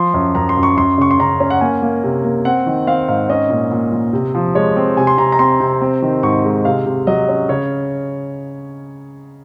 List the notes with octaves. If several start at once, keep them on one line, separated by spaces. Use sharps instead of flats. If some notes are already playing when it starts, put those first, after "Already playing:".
Already playing: F3 C6
F#2
F#2 A#5
C6
F#2
C#6
F#2 C6
C#3 C#6
C6
C#3 A#5
C#4
F#5
A#3 G#5
A#3
C3
A#3
C4 F#5
D#3
C4 F5
G#2 F5
C#4 D#5
A#2
A#2
A#2
C3
F3
G#3 C#5
C4
C3 G#5
C6
C3 A#5
A#5
C4 C6
C3
C4
D#3
G#2 C#6
G#3
C3 F5
C3
F#3 D#5
C#4
C#3 C#5